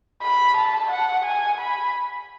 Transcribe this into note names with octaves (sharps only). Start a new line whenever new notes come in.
B5
A5
F#5
G#5
B5